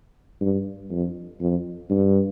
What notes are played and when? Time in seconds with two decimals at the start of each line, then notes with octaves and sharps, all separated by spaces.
0.41 G2
0.91 F2
1.40 F2
1.90 G2